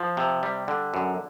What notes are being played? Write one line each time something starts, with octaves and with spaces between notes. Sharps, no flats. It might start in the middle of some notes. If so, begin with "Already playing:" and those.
Already playing: F3
C3
G3
D3
F#2